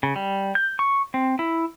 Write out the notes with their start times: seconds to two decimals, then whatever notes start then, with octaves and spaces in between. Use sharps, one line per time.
0.03 C#3
0.16 G3
0.55 G6
0.79 C#6
1.14 C4
1.39 E4